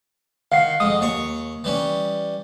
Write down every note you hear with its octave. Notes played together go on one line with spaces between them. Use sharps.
D#3 F5 F#5 C7
F2 G#3 D#6
D#2 C#5 C#6
E3 G3 C#4